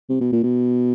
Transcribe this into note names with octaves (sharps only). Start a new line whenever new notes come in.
C3
B2
A#2
B2